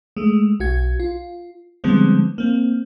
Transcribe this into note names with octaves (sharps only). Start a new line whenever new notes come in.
G#3 A3
B1 F#4 G#6
F4
D3 F3 G3 G#3 B3 C4
A#3 C4